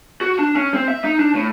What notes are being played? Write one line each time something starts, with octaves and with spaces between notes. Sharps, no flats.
F#4
D4
C#4
C4
E5
D#4
D4
A2